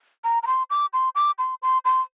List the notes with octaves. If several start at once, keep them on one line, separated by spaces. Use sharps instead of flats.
A#5
A#5
C6
D6
C6
D6
C6
C6
C6